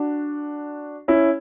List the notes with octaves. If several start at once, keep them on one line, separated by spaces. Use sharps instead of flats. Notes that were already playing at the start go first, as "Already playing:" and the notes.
Already playing: D4 F#4
C#4 E4